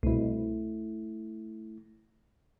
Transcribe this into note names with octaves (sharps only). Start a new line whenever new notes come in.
C2 B2 A3 E4